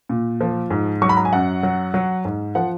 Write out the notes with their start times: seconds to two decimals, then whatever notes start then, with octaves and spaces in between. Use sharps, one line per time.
0.09 A#2
0.41 F3
0.70 G#2
1.02 F#3 C#6
1.09 B5
1.17 A#5
1.25 G#5
1.33 F#2 F#5
1.63 F#3
1.94 F#3
2.25 G#2
2.55 F3 F#5